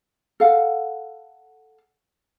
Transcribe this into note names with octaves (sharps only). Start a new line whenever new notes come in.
A4 F5 F#5